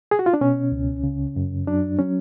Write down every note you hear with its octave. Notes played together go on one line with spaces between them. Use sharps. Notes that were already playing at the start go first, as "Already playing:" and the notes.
G#4
F#4
F4
D4
B2 C#4
C#2
C#3
F#2
F#3 D4
F#3 C#4